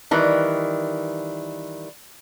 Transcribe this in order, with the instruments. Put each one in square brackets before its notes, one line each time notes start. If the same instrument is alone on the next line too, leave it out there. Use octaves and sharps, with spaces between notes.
[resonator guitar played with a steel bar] D#3 E3 G3